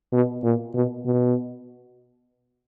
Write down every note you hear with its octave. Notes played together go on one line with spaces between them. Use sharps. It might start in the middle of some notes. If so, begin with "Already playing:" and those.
B2
A#2
B2
B2